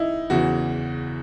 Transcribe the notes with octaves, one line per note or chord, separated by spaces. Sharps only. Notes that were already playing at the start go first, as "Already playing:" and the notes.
Already playing: D#4 E4
E2 C#3 E3 F#4